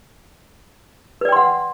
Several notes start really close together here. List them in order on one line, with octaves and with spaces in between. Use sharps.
B4 D5 G5 C6 F#5